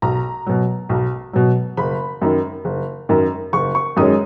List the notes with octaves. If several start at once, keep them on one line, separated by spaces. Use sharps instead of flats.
B1 A#5
B2 F#3
B1
B2 F#3
F#1 B5
F#2 D#3
F#1
F#2 D#3
F#1 C#6
C#6
F#2 D#3 G#3 C#4 D#6